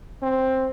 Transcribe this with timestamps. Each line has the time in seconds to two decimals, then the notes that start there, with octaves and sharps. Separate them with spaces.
0.22 C4